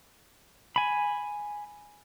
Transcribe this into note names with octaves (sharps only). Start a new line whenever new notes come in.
G#5 B5